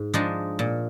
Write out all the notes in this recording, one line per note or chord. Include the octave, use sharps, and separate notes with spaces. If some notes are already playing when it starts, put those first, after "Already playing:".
Already playing: G#2
F3 G#3 D4 D#4
A#2